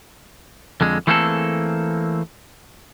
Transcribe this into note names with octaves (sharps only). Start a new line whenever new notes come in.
F2 D3 G#3
E3 A3 A#3 C4 G#4 A4